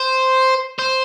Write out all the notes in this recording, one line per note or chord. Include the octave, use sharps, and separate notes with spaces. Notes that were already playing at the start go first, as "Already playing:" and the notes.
Already playing: C5
C5